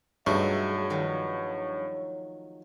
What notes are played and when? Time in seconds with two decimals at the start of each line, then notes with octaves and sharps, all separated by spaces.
0.27 G2 B2 F#3 G#3 A3 C#4 D#4 E5
0.90 D#3 F3 F#3 C#5